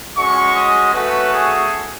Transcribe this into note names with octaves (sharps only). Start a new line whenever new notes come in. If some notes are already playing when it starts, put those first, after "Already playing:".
G#3 C#4 F#4 C#6
D#5
A3 C#4 F#4 B4
G#4